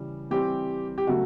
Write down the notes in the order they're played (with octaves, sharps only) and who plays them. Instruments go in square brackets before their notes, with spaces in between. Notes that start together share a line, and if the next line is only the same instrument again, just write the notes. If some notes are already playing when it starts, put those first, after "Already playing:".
Already playing: [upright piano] C#3 E3 G3
[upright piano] E3 G3 C4 [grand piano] G4
[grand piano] G4
[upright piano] C#3 F#3 A3 [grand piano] F#4